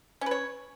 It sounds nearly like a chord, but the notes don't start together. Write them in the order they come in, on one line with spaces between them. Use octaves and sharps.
C#4 B4 C#5